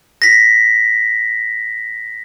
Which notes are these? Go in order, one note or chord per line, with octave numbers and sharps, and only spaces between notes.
A#6 B6